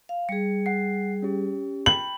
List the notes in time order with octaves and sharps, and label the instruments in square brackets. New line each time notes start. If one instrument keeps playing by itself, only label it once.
[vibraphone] F5
[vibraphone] G3 G#4 [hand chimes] C#7
[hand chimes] F#5 C7
C#4 G4
[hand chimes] G5 B5 [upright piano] F#7